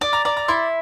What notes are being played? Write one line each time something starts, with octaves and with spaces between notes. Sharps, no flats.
D5 D6
A#5
D5 A#5
A#5
E4 C6